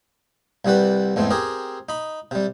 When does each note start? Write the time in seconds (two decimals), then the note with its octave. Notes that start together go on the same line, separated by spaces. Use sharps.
0.65 C2 C3 G3 F#4 B4
1.16 E2 G#2 A3 C4
1.30 C4 G4 G#4 A#4
1.89 D#4 B5
2.31 C3 G3